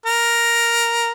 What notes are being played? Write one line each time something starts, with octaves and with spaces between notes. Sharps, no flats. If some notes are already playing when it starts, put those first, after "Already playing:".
A#4